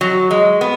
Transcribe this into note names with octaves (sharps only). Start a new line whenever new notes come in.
F#3
G#3
B3